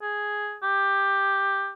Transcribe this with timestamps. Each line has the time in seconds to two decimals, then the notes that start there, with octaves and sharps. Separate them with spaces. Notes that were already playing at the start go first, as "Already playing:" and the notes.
0.02 G#4
0.62 G4